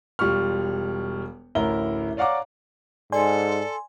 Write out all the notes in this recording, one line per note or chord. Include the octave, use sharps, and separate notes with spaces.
E1 G3 F4 C#6 F6
A1 D2 E4 A#4 A#5 G7
C#5 D5 F5 F#5 A#5 D6
G#2 A4 D5 G#5 C6